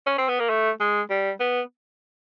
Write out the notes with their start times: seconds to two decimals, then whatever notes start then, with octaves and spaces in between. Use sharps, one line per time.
0.07 C#4
0.18 C4
0.29 B3
0.40 A#3
0.49 A3
0.80 G#3
1.10 G3
1.40 B3